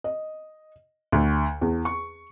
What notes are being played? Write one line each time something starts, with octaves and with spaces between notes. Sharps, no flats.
D#5
D2
E2
C#6